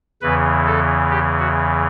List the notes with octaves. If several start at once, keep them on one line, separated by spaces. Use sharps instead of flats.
E2 C#3 E3 B4
A4
G4
F#4